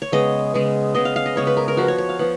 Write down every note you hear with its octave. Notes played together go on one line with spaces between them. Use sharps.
C#5
C#3 G#3 B3 D#5
C#3 G#3 B3
C#3 G#3 B3 D#5
F5
F5
D#5
C#3 G#3 B3 C#5
B4
A#4
A#4
F3 B3 F#4
C#5
C#5
F5
F3 B3 F#5